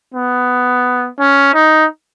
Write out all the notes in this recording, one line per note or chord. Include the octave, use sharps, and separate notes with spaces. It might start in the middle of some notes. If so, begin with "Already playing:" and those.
B3
C#4
D#4